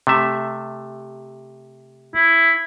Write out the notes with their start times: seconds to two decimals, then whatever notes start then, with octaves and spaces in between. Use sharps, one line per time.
0.07 C3 A3 E5
2.14 E4